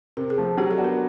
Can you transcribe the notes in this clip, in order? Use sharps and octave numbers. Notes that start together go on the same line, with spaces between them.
C3 A#4
G#4
F3 A3
F#3 G4
A4
B3 D4 F#4
A#4